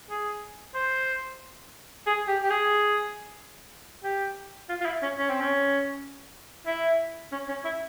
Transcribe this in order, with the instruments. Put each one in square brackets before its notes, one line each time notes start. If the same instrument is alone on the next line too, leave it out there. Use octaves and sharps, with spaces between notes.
[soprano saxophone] G#4
C5
G#4
G4
G4
G#4
G4
F4
F4
E4
C#4
C#4
C4
C#4
E4
C#4
C#4
E4